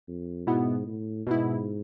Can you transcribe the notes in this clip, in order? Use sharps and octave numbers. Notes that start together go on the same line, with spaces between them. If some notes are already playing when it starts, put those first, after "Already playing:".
F2
G#2 B2 B3 E4
A2
G#2 B2 B3 E4